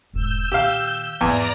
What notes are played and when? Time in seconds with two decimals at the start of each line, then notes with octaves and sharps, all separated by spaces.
0.14 E1 G#2 E6 G6
0.52 A#2 D#3 G4 F5
1.21 E2 G#2 F3 D5 A#5 A#6